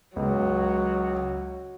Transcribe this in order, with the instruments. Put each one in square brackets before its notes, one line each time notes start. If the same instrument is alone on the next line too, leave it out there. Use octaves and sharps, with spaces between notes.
[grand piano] C#2 [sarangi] F#3